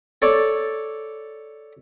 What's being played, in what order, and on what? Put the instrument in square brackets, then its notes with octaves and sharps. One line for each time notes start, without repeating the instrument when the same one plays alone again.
[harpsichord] A4 C#5 D5